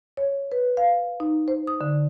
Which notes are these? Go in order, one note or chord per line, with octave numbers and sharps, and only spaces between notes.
C#5
B4
F5
D#4
C5
D#6
D3